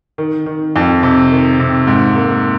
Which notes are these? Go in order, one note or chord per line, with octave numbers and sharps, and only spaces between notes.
D#3
D#3
F2
C3
D#3
C3
G#2
A#3